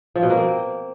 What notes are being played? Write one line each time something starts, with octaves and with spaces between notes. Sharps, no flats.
F3
B2
A#3
C4